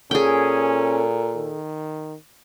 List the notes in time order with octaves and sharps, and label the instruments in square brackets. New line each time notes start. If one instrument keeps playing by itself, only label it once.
[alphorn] A#2 [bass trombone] C#4 [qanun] G#4 G5 [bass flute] A4
[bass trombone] D#3